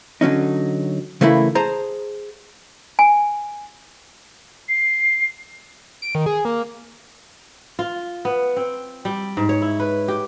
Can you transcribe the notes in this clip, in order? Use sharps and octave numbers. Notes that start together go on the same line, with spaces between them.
D3 F#3 C#4 D#4
C#3 E3 A3 A#3 E4 B5
G#4 C5 A5 A#5
G#5
C7
D7
D#3
G#4
A#3
F4
B3
C4
G3
G#2
C#5
E4
B4
G4